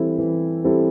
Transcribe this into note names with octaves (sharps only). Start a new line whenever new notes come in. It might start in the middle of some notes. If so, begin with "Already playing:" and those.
Already playing: E3 G3 C4 E4 A4
E3
G3 C4 E4 A4